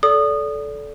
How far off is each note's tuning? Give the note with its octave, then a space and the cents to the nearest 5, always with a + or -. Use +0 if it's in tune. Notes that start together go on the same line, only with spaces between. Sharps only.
A4 -20 D5 -25 D#6 -20